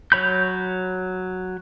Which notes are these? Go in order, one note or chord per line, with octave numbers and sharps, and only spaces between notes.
F#3 C#5 B5 G6